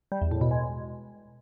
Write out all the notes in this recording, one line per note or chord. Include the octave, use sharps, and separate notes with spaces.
G3
E2
A2
B2
G#3